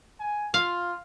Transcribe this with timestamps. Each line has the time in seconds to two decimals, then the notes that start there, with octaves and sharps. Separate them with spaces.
0.20 G#5
0.54 F4 F5